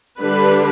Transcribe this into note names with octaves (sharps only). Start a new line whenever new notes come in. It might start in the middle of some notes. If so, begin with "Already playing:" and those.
D3 G3 D4 B4